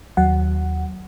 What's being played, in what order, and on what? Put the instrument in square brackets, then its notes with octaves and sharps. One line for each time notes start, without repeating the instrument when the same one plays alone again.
[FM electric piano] D#2 F#3 F#5